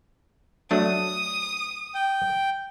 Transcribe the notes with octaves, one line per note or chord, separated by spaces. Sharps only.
F#3 A3 D4 D#6
G5